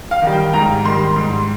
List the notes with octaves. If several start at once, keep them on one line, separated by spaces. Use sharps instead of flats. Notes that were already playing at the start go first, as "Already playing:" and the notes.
F5
D#3 G3
G5
G#2 A#5
D#3 G3 C6
G#2